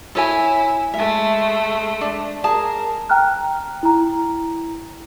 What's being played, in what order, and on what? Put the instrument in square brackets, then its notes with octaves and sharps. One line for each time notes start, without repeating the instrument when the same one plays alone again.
[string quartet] E4 [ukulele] A4 C#5 G#5
[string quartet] G#3 A3 [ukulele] E5
[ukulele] D4
[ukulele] G#4 A5 [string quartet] A#4
[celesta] G5 A#5 F6 F#6
E4 A#5